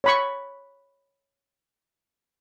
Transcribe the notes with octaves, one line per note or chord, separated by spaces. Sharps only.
C#5 B5 C#6